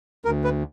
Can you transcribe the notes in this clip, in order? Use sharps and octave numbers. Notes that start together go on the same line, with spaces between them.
D2 A#4
B4